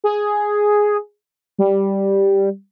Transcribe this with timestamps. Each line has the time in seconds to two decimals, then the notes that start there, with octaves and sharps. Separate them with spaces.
0.04 G#4
1.58 G3